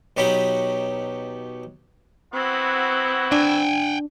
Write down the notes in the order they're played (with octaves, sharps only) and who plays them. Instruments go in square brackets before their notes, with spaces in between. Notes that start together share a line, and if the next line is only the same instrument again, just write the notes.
[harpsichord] B2 F#3 D#4 G4 B5
[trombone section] B3 E4 F#4 [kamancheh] C4
[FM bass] D4 [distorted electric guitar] G5 G#5